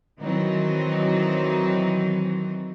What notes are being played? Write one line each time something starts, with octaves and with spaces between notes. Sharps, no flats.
D#3 E3 F#3 C4 D#4